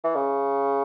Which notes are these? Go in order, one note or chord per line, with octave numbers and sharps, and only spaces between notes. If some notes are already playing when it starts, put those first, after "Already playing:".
E3
C#3